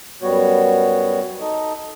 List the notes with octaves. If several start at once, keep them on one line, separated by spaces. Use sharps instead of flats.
F#2 G3 B3 F#4 C#5
D#4 A4 D#5